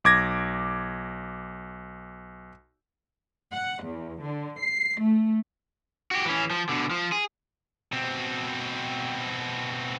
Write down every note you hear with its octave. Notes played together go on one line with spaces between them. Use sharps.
B1 D6 G#6 A#6
F#5
E2
D3
C7
A3
F#4 G4
E3 C#4
F3
B2 D3
F3
G#4
B2 C4